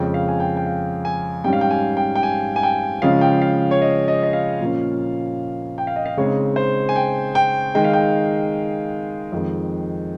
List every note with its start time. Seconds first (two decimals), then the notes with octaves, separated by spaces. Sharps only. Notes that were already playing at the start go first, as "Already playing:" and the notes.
Already playing: F2 C#3 G#3 C#4 G5
0.14 F5
0.28 G#5
0.40 G5
0.57 G5
0.66 F5
1.05 G#5
1.44 G#2 G3 C#4 G5
1.53 F5
1.61 G5
1.70 G#5
1.97 G5
2.15 G5
2.23 G#5
2.56 G#5
2.63 G5
3.02 C#3 F3 G#3 C#4 F5
3.21 G5
3.42 F5
3.71 C#5
3.82 D#5
4.08 D#5
4.23 D#5
4.33 F5
4.60 A#2 F3 A#3 C#4
5.78 G5
5.87 F5
5.96 D#5
6.06 F5
6.17 C#3 G#3 C4 D#4 C#5
6.56 C5
6.89 G#5
6.96 G5
7.35 G5
7.75 D#3 G#3 D#4 G5
7.84 F5
7.93 G5
9.32 F2 D#3 G#3